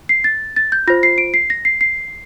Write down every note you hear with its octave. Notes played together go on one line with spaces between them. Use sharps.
C7
A6
A6
G6
F4 C5 A#6
C7
D7
C7
A#6
C7
C7